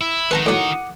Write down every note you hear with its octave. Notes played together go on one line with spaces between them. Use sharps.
E4
D#3 A3 B4 F#5 A5 A#5
A2 F#3 F#5 D6 D#6